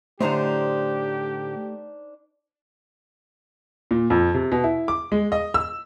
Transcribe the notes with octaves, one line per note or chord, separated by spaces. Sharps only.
A2 D3 A3 D4 D#4 G4 C5 A#5
A#2
F2
C3
B2
E4
D6
G#3
D#5
E6